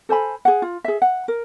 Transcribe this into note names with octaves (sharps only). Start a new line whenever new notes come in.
A4 C5 G#5 B5
G#4 F#5
F4
G#4 E5
F#5
A#4